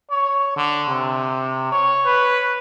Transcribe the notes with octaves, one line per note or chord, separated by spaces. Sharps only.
C#5
D3
C3
C#5
B4